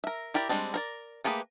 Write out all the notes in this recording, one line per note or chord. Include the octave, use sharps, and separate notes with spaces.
A#4 E5
E4 G4 A#4 D5
G3 G#3 C4 D4
A#4 C5 D5
A3 A#3 G4 G#4 B4